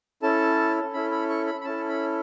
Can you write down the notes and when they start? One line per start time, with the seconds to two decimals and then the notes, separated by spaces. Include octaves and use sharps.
0.23 C#4 E4 A4 A5
0.93 C#4 E4 A4 B5
1.12 B5
1.30 C#6
1.47 B5
1.61 B5
1.65 C#4 E4 A4 A5
1.89 B5